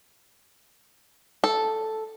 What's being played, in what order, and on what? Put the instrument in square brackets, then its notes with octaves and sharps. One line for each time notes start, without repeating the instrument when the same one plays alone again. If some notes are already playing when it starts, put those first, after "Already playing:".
[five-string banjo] A4